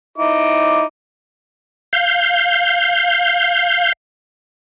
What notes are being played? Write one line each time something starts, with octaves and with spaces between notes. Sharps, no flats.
D#4 E4 D6
F5 G6